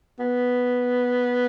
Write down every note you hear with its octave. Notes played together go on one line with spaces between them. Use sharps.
B3